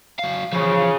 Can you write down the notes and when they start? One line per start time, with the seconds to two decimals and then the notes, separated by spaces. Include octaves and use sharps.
0.19 F#3 F5
0.53 C#3 E3 F3